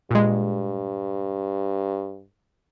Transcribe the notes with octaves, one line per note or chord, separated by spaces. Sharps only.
G2 A#2 G#3